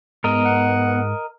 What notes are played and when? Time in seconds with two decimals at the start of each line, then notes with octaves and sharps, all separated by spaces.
0.24 G#2 B3 A#4 D#5
0.45 F#5